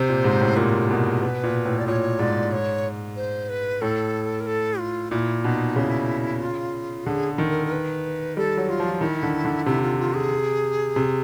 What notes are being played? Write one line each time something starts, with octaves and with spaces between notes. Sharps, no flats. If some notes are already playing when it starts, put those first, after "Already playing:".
Already playing: C3 C5
A#2
G#2
A2
A#2 A#4
B2 A#4
B2 B4
A#2
A2
D5
A#2 C#5
G#2 D5
C#5
C5
B4
A2 A4
A#4
A4
F4
A#2 E4
B2 D#4
C#3 E4
F4
D3 G#4
D#3
A#4
A#4
B4
G3 A4
F#3
F4
F3
D#3 E4
D3
D3
C3 E4
F4
F4
G#4
C3